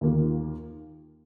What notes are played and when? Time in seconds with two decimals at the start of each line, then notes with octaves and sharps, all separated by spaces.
0.01 D#2 D#3 A#3 F4